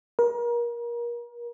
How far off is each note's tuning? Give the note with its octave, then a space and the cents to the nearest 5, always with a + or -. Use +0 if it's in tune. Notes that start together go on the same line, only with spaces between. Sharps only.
A#4 +30